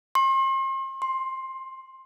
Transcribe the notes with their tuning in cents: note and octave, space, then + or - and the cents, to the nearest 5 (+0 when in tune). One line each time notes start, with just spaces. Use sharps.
C6 +40
C6 +15